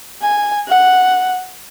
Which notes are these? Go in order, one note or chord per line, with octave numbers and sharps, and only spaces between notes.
G#5
F#5